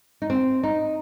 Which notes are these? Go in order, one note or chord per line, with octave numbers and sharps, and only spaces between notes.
D#4
C4
D#4